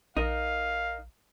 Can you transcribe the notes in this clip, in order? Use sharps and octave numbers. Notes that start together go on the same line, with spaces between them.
A#1 D#4 A#4 F5